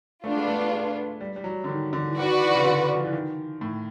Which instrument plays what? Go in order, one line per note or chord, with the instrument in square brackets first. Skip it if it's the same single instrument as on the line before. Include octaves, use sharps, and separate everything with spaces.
[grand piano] A3 [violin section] B3 D4 F4
[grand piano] G#3
A3
G#3
G3
G3
F#3
D3
D#3
D3
E3
[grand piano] D#3 [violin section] F#4 B4 D5
[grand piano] E3
C#3
D3
F3
E3
D#3
A2